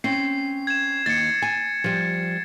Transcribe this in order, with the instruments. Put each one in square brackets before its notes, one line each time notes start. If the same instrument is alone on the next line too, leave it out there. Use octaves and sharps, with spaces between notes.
[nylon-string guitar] C4 C#4 [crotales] C7
[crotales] G#6 E7
[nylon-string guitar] D#2 [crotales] A6 C#7
[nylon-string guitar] G#5
F3 G3